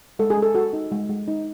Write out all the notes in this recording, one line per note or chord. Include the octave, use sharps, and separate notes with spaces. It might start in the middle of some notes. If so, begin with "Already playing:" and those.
G#3 A4
G#4
G#3
A4
F#4 A4
D#4
G#3
G#3
D#4